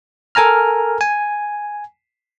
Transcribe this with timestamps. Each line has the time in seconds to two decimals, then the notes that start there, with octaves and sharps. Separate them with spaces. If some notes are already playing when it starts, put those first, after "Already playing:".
0.35 A4 A#4 G#5 A#5 F6
1.01 G#5